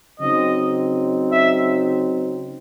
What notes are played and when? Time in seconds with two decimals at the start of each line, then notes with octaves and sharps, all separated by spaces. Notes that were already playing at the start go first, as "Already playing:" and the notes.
0.20 C#3 F#3 C4 D#4 D#5
1.32 E5